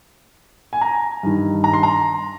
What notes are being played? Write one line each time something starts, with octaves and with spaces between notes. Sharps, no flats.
G#5
A#5
G2 D#3
A#5
C6
A#5